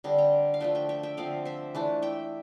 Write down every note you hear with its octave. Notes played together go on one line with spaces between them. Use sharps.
D3 G3 C4
G5 A#5
F5
F3 A3 D4 E5 G5
E5 G5
E5 G5
E5 G5
D3 F3 C4 D5 F5
C5 E5
E3 A3 D4
E5 G5